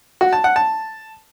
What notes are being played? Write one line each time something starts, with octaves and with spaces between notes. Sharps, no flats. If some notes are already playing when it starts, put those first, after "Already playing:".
F#4
A5
F#5
A5